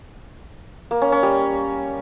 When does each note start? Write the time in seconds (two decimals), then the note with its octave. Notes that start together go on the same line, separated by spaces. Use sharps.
0.91 A#3
1.01 C#4
1.12 C#4
1.23 G3